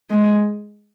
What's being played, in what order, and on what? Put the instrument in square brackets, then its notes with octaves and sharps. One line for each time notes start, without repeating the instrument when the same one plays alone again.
[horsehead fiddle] G#3